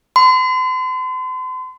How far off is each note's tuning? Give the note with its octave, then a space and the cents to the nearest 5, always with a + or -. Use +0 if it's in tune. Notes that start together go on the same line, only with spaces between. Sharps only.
C6 -40